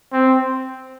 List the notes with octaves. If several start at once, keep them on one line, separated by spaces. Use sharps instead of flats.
C4